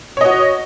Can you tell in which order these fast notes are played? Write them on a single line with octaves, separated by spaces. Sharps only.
C#5 D#5 F#4